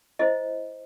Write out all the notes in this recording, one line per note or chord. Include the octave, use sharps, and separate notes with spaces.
E4 C5 D#5